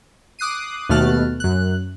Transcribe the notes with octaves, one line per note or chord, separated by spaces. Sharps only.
D6 D#6 F#6 C7 D#7
D#2 B2 A3 F6 F#6 A6
F#2 F#6